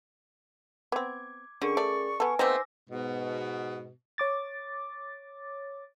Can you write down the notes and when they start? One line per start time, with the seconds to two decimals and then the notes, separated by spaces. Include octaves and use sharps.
0.92 B3 C4 D6 G#6
1.62 D3 C#4 G#4 A#4 C#6
1.77 A3 D5
2.20 B3 A4 B4 G#5
2.39 A3 B3 C4 D#4 C5 D6 E6 A#6
2.90 G#2 B2
4.18 C#5 D6 A6